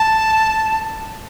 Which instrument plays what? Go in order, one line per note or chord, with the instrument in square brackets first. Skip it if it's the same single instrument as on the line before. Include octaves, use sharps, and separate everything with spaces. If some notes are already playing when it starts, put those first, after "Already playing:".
Already playing: [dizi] A5